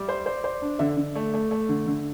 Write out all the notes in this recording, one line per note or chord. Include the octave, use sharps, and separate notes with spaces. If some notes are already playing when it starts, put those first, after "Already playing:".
Already playing: G3 D5 E5
C5
C5
C5
D4
D3 E5
D3
A3
A3
A3
D3
D3